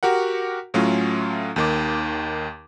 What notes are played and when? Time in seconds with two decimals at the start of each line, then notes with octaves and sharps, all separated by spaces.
0.03 F#4 G4 A#4 F#5
0.74 A2 F#3 A3 C#4 F4
1.56 D#2 D#3 D6